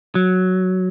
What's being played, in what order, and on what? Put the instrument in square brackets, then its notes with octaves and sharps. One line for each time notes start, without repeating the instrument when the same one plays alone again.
[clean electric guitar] F#3